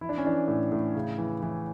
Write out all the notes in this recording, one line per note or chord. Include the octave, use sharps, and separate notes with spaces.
E3 E4
D4
C#4
E3 D4
A2
A2
C#3
E3
E3